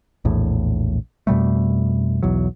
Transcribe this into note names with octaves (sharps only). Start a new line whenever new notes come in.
A#1 E2 A2
F2 B2 G3 A3
B1 E2 F#3